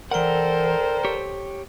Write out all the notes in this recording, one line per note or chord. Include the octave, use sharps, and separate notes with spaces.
E3 A4 A#4 C5 D5 F#5 G5
G4 C#5